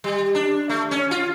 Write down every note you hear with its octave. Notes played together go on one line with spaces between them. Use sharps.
G3
D4
A3
C#4
F4